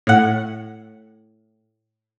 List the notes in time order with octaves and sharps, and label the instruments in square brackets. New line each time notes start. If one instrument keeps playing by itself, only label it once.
[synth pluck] A2 F#5